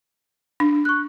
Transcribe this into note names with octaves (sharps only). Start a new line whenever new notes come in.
D4
C#6 F#6